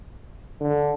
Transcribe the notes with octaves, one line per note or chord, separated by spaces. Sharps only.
D3